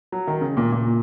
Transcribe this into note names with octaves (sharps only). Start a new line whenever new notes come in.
F#3
D#3
C#3
A#2
A#2